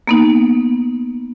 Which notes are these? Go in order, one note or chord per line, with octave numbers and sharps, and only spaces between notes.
A#3 B3 D#4